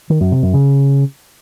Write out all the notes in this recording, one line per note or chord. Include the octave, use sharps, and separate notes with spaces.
D#3
F#2
C3
F#2
C#3